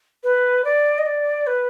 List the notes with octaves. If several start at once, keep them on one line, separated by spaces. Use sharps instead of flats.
B4
D5
D#5
D5
B4